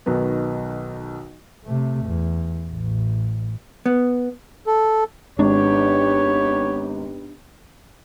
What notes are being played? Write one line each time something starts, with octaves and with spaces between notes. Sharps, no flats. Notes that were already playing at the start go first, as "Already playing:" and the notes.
B1 B2 D#3 F#3 B3
C3 A3
E2
A1
B3
A4
G#1 B3 D4 D#4 G4 C#5